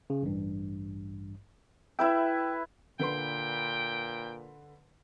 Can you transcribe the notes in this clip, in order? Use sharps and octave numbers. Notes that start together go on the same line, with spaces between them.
C#3
A1 G2
E4 B4 E5 G5
A#2 D3 B4 G5 C6